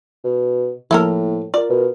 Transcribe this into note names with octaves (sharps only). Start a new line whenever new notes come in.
B2
A2 F3 A#3 E4 A4 A#4
F4 A#4 D5
B2